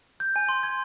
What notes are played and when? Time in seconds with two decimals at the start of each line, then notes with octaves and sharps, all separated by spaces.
0.20 G6
0.36 G#5
0.49 C6
0.63 G#6